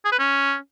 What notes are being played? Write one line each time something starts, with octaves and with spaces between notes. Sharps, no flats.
G#4
B4
C#4